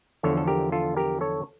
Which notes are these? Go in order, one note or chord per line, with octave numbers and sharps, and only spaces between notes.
E2 D3 F3 A4 C#5
A4
G4 A#4
F4 A4
G4 A#4
A4 C#5